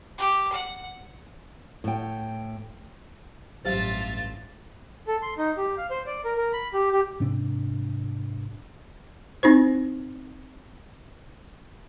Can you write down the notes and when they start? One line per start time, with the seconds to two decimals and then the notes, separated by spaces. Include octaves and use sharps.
0.18 G4
0.53 F#5
1.84 A2 G5
3.65 A1 G2 F#3 F4 G4 C5 E5 A6
5.08 A4
5.22 C6
5.38 D#4
5.58 G4
5.78 F5
5.90 C5
6.07 D5
6.25 A#4
6.37 A#4
6.53 B5
6.74 G4
6.93 G4
7.20 G#2 C3 D4
9.43 C4 D#4 E4 C5